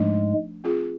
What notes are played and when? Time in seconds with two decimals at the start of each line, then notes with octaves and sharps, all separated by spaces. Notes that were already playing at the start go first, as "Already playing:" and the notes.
Already playing: G#2 F3 G#3 A3 D4
0.64 C4 F4 G#4